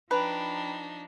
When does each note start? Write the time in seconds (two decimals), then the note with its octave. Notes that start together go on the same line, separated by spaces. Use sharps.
0.11 F3 D4 D#4 B4 G5 A#5 B5